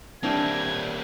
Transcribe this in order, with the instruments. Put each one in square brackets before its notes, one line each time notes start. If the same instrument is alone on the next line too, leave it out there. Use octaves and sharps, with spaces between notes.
[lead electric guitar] G3 A#3 [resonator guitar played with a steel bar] C4 D4 E4 [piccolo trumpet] G#6